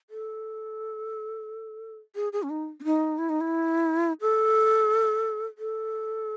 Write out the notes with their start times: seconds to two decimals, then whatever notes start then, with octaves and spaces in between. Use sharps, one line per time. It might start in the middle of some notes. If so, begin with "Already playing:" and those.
0.10 A4
2.16 G#4
2.33 G#4
2.43 C#4
2.50 D#4
2.80 C#4
2.84 D#4
3.18 E4
3.29 D#4
3.41 E4
4.21 A4
5.58 A4